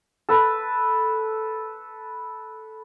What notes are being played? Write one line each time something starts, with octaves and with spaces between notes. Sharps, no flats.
A4 B4